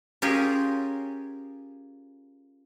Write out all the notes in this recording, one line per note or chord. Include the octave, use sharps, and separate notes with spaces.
C#4 F4 G4 G#4 A#4